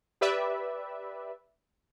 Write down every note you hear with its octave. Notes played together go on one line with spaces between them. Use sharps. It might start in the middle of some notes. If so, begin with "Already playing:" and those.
G4 B4 D5 E5